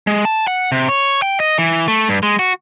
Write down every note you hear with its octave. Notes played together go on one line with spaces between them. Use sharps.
G#3
A5
F#5
C3
C#5
G5
D#5
E3
A3
G2
G#3
F#4